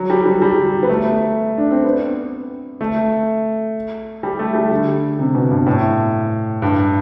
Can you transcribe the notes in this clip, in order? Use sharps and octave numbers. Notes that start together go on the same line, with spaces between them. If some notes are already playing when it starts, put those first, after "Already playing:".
Already playing: F#3
G3
G3
G3
B3
A3
D4
C4
B3
A3
G3
A3
G3
D3
C3
B2
G2
A2
G2